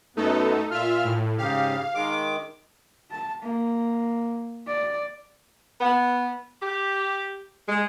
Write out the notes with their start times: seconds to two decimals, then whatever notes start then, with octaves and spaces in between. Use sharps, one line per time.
0.17 F#2 A3 B3 D#4 A4
0.71 A#2 F4 E5 F6
1.04 A2
1.38 G#2 C#3 G4 F5
1.95 D#3 G#3 D6
3.11 A5
3.42 A#3
4.68 D5
5.81 B3
6.62 G4
7.68 G#3